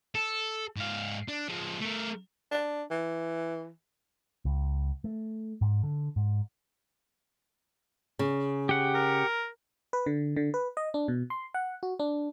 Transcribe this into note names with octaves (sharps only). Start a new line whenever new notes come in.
A4
G#2 F5
D4
F3 G#3
A3 A#4
D4
E3
C#2
A3
G#2
D3
G#2
C#3
G4 F#5
A#4
B4
D3
D3
B4
D#5
D4
B2
C6
F#5
F#4
D4